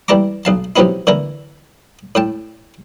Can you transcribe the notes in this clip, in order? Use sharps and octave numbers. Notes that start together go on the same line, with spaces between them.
E3 G3 A5 A#5 D6
B1 F5 A5
C3 F3 F#3 B3 D#4 E4
D3 E3 E4 A#4
A2 G5 A5